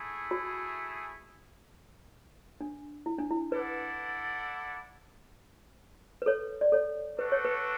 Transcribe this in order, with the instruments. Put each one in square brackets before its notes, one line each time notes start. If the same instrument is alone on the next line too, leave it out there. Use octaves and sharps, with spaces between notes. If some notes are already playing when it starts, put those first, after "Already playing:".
Already playing: [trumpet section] A3 E4 G#4
[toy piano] F#4
D4
E4
D4
E4
[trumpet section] E4 A4 D5 F#5 [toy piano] B4
[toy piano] B4
A4 C#5
D5
A4 C#5
[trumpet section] A3 D4 F#4 A4 [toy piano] B4
[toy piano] C#5
B4